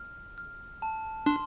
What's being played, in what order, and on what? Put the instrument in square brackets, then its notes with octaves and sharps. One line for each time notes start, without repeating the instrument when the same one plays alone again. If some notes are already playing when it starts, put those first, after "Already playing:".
Already playing: [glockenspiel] F6
F6
A5
[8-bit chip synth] D4 [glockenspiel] C6